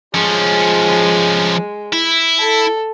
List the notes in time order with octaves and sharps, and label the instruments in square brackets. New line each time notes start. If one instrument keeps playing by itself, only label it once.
[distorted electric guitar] F3 C#4 [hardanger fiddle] G#3
[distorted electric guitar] E4
[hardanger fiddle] A4